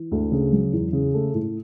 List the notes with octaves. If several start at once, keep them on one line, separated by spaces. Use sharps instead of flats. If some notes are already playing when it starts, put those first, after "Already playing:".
Already playing: E3
D2
C#3
F#3
E2
C#3
A3
A2